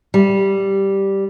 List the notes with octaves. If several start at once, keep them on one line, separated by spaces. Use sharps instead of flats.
G3